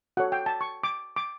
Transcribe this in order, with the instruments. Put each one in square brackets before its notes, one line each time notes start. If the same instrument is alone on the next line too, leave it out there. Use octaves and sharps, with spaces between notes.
[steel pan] F#4 A4 C#5 F#5
G5
A5
C#6
D6
D6